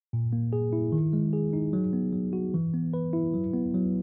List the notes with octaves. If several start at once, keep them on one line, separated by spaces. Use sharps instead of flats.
A#2
A#3
G#4
E4
D#3
G#3
G#4
D#4
F#3
B3
F#3
F#4
E3
B3
B4
E4
F#3
B3
F#3